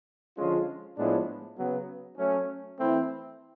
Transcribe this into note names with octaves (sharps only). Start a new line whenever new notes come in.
D3 F3 G#3 C#4 F4
A2 F3 G#3 B3 D4
C#3 F#3 B3
F#3 A3 C#4
E3 A3 C4 E4